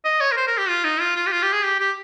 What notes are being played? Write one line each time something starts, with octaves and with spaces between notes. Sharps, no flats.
D#5
C#5
A#4
C5
A#4
G4
F4
D#4
F4
F4
G4
F4
G4
G#4
G4
G4